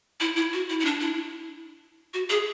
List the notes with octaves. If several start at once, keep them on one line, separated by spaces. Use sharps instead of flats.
E4
E4
F#4
E4
E4
D4
E4
F#4
G#4